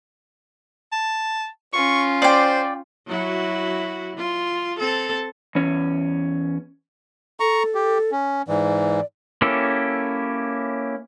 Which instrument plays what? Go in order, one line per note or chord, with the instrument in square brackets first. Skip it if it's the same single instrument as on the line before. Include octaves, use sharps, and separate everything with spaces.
[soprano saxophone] A5
[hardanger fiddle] C#4 F4 [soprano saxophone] C#6
[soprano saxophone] C5 [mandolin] D5 G5
[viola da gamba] F#3 E4 F#4
F4
C4 A4
[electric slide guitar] E2 C#4
[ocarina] A4 [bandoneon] A#5 C#6
[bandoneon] G4
C#4
[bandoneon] G#2 E3 [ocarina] D5
[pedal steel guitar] A#3 C#4 E4 G4 A4